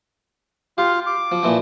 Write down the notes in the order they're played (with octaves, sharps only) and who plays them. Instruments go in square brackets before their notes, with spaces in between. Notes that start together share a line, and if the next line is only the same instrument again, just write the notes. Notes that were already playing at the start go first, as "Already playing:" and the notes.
[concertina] F4 F5 [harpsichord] G4
[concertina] D6
[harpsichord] F3
A#2 E3 F3